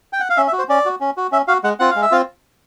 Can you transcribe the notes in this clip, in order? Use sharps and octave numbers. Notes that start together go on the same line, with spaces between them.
G5
F#5
F5
C#4 E5
E5
F#4
C5
C#4 D5
F#4
C#4
F#4
C#4 E5
F#4 F5
G#3 F#5
C4 F4 F#5
F5
G#3
E5
C4 F4 F5